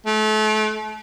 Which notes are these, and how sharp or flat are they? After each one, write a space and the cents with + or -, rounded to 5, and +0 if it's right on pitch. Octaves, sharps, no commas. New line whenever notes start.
A3 -35